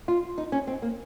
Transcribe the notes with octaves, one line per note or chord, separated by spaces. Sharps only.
F4
D#4
C#4
C4
A#3